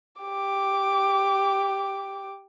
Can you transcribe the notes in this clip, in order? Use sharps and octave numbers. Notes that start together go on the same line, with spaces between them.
G4 D6